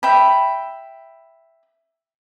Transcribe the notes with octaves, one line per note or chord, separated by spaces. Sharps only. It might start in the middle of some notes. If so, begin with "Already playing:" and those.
E5 G5 B5